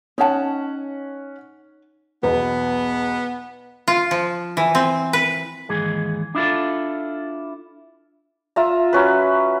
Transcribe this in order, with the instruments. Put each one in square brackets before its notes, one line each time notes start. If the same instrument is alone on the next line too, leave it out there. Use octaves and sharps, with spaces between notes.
[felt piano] C#4 F#5 [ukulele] D#4 C#5 A5
[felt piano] B1 E2 [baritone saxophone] B3 [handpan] B4
[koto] F4
F3
E3
C4
B4
[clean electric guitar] D#2 G#2 E3 G#4
D4 E4 F4 A4
[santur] F4 E5 A#5
F#3 C#4 B4